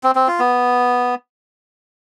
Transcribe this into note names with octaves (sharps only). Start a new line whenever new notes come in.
C4
C4
F4
B3